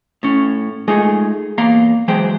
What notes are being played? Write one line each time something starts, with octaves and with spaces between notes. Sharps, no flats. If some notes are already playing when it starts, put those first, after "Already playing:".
A2 C#4
G#3 A3 D#4 F4 G#4
E2 A#3 F5 A#5 C6
E3 F#3 G#3 G#4 C5 G5